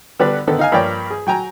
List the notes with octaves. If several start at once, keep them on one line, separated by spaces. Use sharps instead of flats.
D3 G3 B3 D4 B4 D5
D3 D#3 B3 A4
D#4 F5 G#5
G2 F3 A#3 C#5 D5 G5
G#4
F#3 G5 G#5 A#5